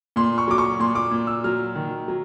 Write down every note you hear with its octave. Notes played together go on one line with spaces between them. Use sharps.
A#2 C6
C#6
F#3 D6
C#6
A#2 C6
D6
A#2
E6
F#3 F6
D#3
F#3